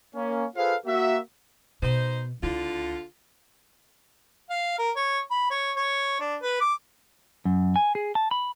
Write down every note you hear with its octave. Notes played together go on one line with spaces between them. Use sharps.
A#3 C#4
F4 G#4 A4 B4 C5 F5
A#3 F#4 E5
B2 D#4 C5
C#2 D3 E4 F4
F5
A#4
C#5
B5
C#5
C#5
D4
B4
D6
F#2
G#5
G#4
A5
B5